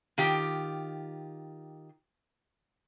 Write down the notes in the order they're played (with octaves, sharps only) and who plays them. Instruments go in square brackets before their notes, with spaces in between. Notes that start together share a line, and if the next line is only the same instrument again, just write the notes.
[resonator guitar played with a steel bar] D#3 F4 G4